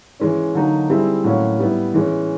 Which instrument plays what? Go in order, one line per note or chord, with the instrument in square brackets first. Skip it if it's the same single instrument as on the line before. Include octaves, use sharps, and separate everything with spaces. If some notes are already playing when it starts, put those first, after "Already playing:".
[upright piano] E3 G#3 C#4
D3 F#3 A#3 D#4
G3 C4 E4 G#4
A2 F#3 A#3 C#4 F#4
G3 B3 E4
E3 G#3 C#4